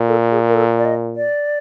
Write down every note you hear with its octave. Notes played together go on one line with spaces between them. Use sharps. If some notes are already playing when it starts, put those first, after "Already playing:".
Already playing: A#2
A4
G#4
A#4
A4
D5
D#5
D5